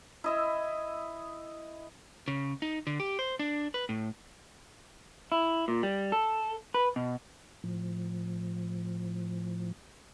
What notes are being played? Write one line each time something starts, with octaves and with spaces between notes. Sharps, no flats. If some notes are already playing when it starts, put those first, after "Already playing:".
E4 D#5 E5
C#3
D#4
D3
G4
C5
D4
B4
A2
E4
A#2
G3
A4
B4
B2
A2 F3